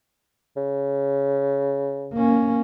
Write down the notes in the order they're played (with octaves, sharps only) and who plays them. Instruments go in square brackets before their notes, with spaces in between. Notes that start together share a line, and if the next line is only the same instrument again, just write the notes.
[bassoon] C#3
[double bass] A#3 C#4